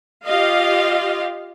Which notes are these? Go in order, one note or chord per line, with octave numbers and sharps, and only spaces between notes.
F4 G4 D#5 F5